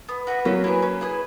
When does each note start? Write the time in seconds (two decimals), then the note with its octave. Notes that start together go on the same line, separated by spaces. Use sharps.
0.09 B3
0.27 F#4 B4 E5
0.45 F#3 A#3 C#4
0.64 E4 G#4 B4
0.82 C#4
1.01 E4 G#4 B4